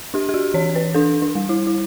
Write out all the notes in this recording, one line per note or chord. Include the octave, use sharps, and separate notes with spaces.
D4 G4
G4
F#4
E3 C#5
B4
D4 A4
D4
G3
E4
E4